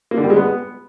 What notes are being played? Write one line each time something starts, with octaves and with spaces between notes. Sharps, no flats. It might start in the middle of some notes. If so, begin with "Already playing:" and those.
A#3
D3
G3
G#3
B3